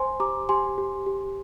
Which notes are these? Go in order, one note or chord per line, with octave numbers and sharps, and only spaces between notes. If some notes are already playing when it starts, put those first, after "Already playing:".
Already playing: C5 G#5 C6
G4 A#5 D6
G4 G#5 C6
G4
G4